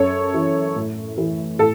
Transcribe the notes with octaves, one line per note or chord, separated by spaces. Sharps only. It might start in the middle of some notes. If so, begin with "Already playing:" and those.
Already playing: F#2 A4 C#5
E3
A2
E3
A2 A4